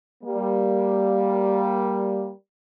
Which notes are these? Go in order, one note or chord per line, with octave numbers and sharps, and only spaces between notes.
G3 A#3